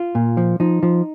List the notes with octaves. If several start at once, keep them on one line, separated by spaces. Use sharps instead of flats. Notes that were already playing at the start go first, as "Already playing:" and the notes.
Already playing: F4
A#2
F3
F3 D#4
F3